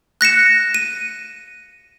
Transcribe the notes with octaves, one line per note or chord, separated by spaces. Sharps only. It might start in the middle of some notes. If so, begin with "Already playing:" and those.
F#6 A#6 C#7 E7
D#7